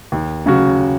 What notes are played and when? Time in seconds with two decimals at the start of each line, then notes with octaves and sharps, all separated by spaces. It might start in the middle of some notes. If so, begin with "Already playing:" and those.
0.12 D#2
0.46 C#3 F#3 C#4 F#4